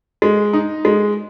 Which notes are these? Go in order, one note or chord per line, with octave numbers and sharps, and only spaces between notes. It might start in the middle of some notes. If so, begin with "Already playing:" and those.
G#3
D#4
G#3